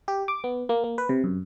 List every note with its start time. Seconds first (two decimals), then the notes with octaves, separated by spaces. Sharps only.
0.08 G4
0.28 D6
0.44 B3
0.69 A#3
0.84 A#3
0.98 B4
1.09 C3
1.24 F#2